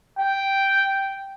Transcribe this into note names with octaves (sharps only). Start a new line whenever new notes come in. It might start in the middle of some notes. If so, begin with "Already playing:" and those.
G5